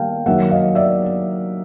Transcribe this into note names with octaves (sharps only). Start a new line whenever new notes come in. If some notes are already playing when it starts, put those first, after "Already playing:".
Already playing: D#3 G3 A#3 F5 G5 A5
D#3 F#3 A#3 E5 F#5
D#5 F5
D5 E5